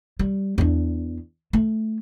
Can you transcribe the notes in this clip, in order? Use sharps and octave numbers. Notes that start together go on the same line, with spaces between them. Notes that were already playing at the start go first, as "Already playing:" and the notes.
G3
E2 D4
A3